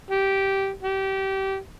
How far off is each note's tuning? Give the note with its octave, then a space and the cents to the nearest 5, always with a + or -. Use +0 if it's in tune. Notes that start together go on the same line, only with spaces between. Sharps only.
G4 -10
G4 -25